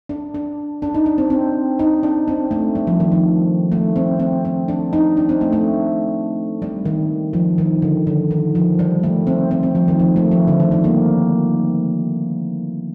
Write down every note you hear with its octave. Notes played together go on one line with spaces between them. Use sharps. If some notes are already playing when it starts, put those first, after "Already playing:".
D4
D4
D4
D#4
D4
C4
C4
D#4
D4
C4
A3
G3
F3
D#3
F3
A3
C4
C4
C4
D4
D#4
D4
C4
A3
A3
G3
D#3
F3
D#3
D3
D3
D#3
F3
G3
A3
C4
C4
C4
F3
D#3
F3
A3
F3
D3
D#3
G3
A#3